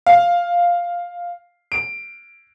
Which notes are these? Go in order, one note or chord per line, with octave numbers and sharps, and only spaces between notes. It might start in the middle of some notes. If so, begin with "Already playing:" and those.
F5
D7